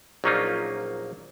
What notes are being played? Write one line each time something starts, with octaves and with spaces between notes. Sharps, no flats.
A#1 F#3 A#3 C#4 D#4 F4